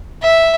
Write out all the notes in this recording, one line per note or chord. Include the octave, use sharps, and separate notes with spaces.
E5